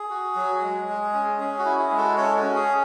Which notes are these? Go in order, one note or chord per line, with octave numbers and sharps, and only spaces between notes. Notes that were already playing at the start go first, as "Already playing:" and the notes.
Already playing: G#4
F#4
F#3
G#3
G#3
C#4
C#4 G#4
F#4
E4
G#4
G#3
F#4 A4
C#4 A4 C#5
F#4
C#4
G#4